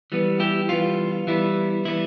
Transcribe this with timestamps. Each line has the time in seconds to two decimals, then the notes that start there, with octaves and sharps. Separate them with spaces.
0.12 E3 G3 B3
0.40 E4 G4
0.69 E3 G3 B3 F4
1.27 E3 G3 B3 E4
1.85 E3 G3 B3 E4